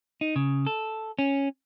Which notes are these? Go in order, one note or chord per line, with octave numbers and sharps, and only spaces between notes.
D#4
C#3
A4
C#4